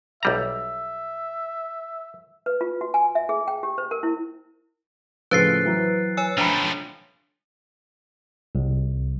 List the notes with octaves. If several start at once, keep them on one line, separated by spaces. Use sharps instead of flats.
B1 G3 E5 A#5
B4
F4
F#4
G#5
E5
G#4
G5
G4
C5
A#4
E4
A2 C#3 F3 B4 C5 F#6 A6 C7
E3 F#3
C#5 G#5 E6
F3 A3 D4 G#5 A#5 B5 G7
C2